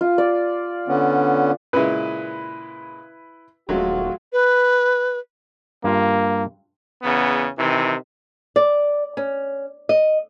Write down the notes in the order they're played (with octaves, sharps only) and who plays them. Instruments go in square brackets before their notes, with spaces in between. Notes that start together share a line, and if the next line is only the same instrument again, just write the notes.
[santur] F4
D5
[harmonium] D3 B3 C#4
[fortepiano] A#2 C#3 G#3 [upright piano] E4 B4
[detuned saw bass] D#1 [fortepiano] F#3 G#3 A3 [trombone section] F4 F#4
[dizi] B4
[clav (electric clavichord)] G2 F4 [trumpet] A#3
[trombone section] E2 C#3 B3
C3 D#3 E3
[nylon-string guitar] D5
C#4
D#5